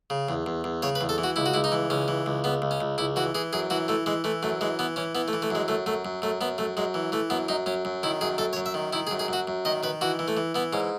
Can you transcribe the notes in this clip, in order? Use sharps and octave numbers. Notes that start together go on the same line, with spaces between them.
C#3
E2
E2
E2
C#3 C#5
B4
E2
A4
E3
F#4
C#2 E4
F#4
C#2 E4
D#4
E3
C#2 C#4
E3
C#2
C#2 B3
C#2
C#4
C#2
C#2 E4
E3 F#4
E3 G#4
F#2 G#4
E3 F#4
E3 A3
E3 G#3
E3 A3
F#2 A3
E3 G#3
E3 B3
E3 C#4
E3 B3
A3
E3
A3
F#2 G#3
F#2 A3
F#2 A3
F#2
F#2 A3
F#2 B3
F#2 A3
F#2 G#3
E3
E3 A3
F#2 B3
F#2 D#4
F#2 C#4
F#2
D#3 E4
F#2 G#4
F#2 A4
C#5
F#2
E5
D#3
D#3 E4
G#4
F#2
G#4
F#2 F#4
F#2
D#3 D#5
D#3 B4
E3 F#4
E3
A3
E3
E3 B3
G#2 C#4